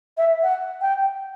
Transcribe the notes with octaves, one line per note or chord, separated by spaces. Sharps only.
E5
F#5
G5